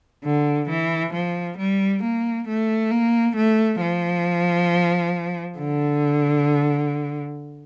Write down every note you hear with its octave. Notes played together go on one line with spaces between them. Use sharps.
D3
E3
F3
G3
A#3
A3
A#3
A3
F3
D3